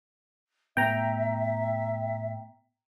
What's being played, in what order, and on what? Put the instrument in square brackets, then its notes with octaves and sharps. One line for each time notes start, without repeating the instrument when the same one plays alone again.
[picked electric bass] A2 B3 [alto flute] E5 [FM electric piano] G5 A#5